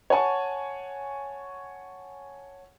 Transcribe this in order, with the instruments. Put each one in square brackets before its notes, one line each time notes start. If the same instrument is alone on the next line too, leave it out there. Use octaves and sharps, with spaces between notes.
[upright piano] C#5 F#5 G#5 A5 C#6